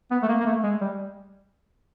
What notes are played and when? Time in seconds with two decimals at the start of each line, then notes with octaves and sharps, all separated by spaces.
0.11 B3
0.22 A3
0.29 A#3
0.40 A#3
0.46 A3
0.64 G#3
0.81 G3